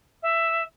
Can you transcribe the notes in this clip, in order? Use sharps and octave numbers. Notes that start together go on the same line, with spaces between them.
E5